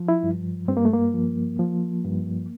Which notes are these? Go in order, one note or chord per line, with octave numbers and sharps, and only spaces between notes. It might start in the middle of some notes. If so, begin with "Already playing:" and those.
Already playing: F3
E4
G2
G2 C4
A#3
A3
A#3
F3
F3
G2